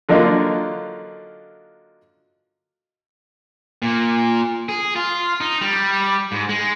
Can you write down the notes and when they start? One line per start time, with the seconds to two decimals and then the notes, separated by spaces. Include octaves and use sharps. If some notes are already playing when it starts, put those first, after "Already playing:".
0.09 D3 F#3 A#3 D#4 F4 A4
3.82 A#2
4.69 G#4
4.96 F4
5.41 D#4
5.61 G3
6.32 G#2
6.49 G#3